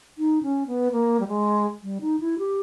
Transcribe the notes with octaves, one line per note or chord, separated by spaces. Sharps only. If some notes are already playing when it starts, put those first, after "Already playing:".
D#4
C#4
B3
A#3
G3
G#3
G3
D#4
E4
G4